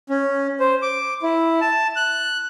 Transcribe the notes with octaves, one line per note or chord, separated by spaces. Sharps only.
C#4
C5
D6
E4
A5
F#6